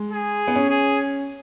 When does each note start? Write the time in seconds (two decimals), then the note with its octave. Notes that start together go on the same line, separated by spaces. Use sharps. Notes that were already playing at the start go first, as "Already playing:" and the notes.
Already playing: G#3
0.12 G#4
0.48 B3
0.56 C#4
0.70 G#4